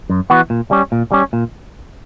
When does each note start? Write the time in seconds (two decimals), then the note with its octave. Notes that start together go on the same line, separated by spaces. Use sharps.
0.10 F#2
0.30 E3 B3 F#4
0.50 A#2
0.71 G3 C#4
0.92 A#2
1.12 G3 C#4
1.33 A#2